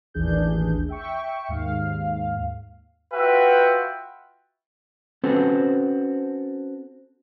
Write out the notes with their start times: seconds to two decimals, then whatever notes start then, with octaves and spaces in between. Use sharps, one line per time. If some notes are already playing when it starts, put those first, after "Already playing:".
0.14 A1 D#2 E3 D4 G#4 G6
0.89 E5 G5 C#6
1.49 D#2 G#2 F5
3.13 F4 F#4 B4 E5 G5
5.24 C4 C#4 F#4 A4 B4 C5